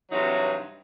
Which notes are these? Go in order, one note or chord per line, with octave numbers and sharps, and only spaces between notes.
G2 C3 E3 F#3 C4 D#4